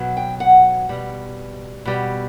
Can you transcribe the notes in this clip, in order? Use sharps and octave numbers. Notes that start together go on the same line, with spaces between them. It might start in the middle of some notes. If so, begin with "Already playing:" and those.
Already playing: B2 F#3
G5
F#5
B2 G3
B2 G3